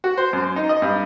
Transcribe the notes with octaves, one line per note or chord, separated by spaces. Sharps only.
F#4
C5
F#2
D#4
D#5
G2